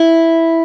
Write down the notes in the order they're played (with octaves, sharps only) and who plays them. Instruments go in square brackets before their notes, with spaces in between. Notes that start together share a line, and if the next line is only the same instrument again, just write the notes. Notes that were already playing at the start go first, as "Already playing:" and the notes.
Already playing: [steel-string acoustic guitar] E4